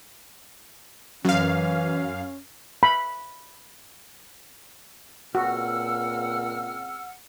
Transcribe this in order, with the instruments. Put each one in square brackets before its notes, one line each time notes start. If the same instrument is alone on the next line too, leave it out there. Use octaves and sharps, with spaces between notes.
[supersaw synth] F#2 F5 [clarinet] E3 [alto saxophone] C#4
[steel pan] B5
[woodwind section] C#2 C4 E6 [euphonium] A#2 [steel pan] F#4 [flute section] F#5 F6